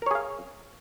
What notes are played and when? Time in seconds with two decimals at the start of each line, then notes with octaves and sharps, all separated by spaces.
0.02 A#4
0.06 C#5
0.11 G#4
0.15 F5